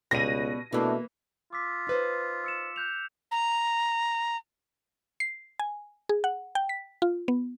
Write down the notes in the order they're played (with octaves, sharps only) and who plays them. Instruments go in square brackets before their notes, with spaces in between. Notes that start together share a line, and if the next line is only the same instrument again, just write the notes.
[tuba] C#2 [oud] B2 G3 [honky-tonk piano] A#6 D#7
[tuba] B2 [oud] E3 A#3 [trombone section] A3 D4 E4
[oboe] F4 [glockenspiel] D6 E6 B6
[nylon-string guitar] D#4 B4 C5
[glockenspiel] E6 C#7 E7
F#6 G6 F7
[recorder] A#5
[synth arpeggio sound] C7
G#5
G#4
F#5
G5
B6
F4
B3